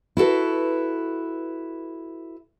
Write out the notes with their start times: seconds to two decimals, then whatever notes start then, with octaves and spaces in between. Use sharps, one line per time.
0.17 E4 F#4 A4 B4